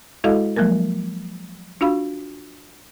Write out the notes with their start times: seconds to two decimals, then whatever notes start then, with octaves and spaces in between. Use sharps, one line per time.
0.24 G#3 E4 F#4 A4 D#5 F5
0.56 F3 F#3 G#3 A#3 A#4
1.81 D4 F4 F#4 F5 B5